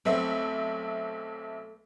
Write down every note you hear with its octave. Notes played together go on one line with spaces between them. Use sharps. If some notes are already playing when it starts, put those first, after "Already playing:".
B1 A3 C4 B4 C#5 E5